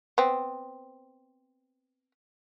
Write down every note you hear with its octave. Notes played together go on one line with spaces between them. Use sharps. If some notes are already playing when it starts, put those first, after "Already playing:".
B3 C4